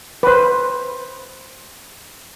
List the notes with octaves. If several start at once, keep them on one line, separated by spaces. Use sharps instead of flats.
B4 C5